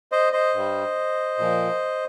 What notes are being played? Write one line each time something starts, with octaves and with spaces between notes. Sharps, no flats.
C5 D#5
C5 D#5
G2 G3
A#2 F3